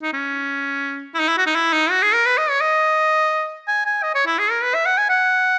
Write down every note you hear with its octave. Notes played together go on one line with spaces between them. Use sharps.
D#4
C#4
E4
D#4
E4
F#4
D#4
E4
D#4
F#4
G#4
A#4
B4
D#5
C#5
D#5
G#5
G#5
D#5
C#5
E4
G#4
A#4
B4
E5
F#5
G#5
F#5